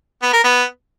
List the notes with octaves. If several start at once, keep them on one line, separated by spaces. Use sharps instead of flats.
B3
A#4
B3